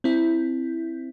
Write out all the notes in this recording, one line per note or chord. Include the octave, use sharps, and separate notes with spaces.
C4 E4